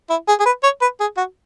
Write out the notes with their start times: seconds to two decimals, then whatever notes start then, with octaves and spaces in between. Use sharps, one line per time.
0.10 E4
0.29 G#4
0.40 G#4
0.46 B4
0.64 C#5
0.82 B4
1.01 G#4
1.18 F#4